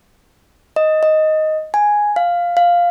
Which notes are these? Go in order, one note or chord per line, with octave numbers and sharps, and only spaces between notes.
D#5
D#5
G#5
F5
F5